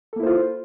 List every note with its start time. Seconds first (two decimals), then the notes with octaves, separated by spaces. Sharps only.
0.13 A4
0.16 A#3
0.20 E4
0.23 C5
0.26 F4